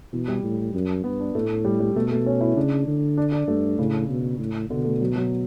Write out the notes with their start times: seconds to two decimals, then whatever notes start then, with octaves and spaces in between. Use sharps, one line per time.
0.13 B2 E3
0.28 G3
0.43 A2
0.74 F#2
1.04 G2 B3
1.20 D4
1.35 A2 A3
1.65 G3
1.80 G3
1.95 B2 A3
2.12 A3
2.26 C#4
2.41 E4
2.56 C#3 D4
2.87 D3
3.18 D4
3.32 D4
3.48 G2 A3
3.78 A2 C#3
4.09 B2
4.39 A2
4.70 B2 D3
4.85 A3
5.01 F#3
5.16 F#3